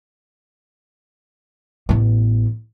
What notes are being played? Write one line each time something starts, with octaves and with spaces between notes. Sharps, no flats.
A1 B3